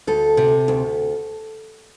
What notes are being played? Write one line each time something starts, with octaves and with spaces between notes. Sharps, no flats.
D2 A4
C3
D2